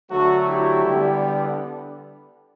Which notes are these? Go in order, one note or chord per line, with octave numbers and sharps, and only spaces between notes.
D3 F#3 A3 F#4 A4
E4 G4
D3 G3 B3